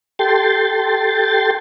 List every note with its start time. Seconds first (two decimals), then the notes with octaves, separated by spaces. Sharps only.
0.19 G4 A4 G5 C6 A6